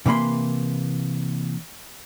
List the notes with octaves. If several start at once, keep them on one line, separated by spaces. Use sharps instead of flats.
C3 E3 A#3 B5 C6